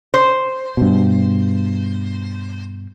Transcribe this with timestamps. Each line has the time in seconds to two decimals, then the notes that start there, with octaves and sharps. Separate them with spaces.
0.14 C5
0.77 G2 B2